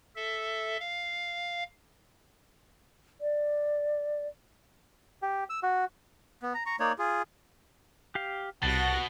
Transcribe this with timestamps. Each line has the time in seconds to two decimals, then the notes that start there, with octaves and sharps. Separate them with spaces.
0.16 A4 E5
0.80 F5
3.21 D5
5.22 G4
5.50 E6
5.63 F#4
6.42 B3
6.54 A#5
6.66 A#5 C#6
6.80 A#3 D#4 C#5 D5
6.99 F4 G#4
8.15 G4 F5
8.63 C2 B2 F#4 F#5 A5 A#6